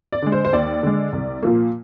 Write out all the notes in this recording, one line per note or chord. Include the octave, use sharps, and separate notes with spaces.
D5
D3 G#3
C5
C5
D#2 D5
D3 G#3
C2
A#2 F3 A#3